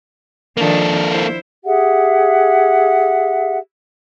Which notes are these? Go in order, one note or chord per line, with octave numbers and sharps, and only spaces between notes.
D#3 F3 A#3 D4 A4
E4 C5
G4 G#4 E5 F#5